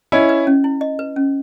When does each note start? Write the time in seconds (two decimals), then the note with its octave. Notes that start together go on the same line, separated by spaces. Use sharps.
0.12 C#4 E4 D#5
0.29 B4
0.47 C#4
0.64 E4
0.81 D#5
0.99 B4
1.16 C#4